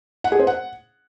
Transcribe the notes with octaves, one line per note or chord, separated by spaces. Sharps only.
F#5
G#4
C5
F#5